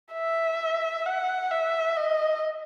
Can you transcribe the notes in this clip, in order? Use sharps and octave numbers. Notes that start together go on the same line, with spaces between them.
E5
F#5
E5
D#5